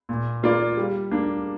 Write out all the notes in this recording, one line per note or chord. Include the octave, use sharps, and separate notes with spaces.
A#2
A#3 F4 D5
G3
A#3 D4